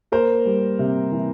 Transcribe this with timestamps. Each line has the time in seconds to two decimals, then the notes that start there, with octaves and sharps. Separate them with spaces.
0.12 A#3 A#4 C5
0.45 G3
0.79 C3
1.12 E3